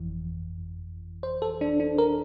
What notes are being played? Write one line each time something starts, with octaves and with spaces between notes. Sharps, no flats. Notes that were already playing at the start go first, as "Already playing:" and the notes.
Already playing: G1 F2 E3
C5
A4
D4
D4
A#4